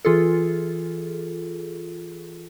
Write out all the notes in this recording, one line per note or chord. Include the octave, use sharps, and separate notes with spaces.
E3 F4 G#4 A4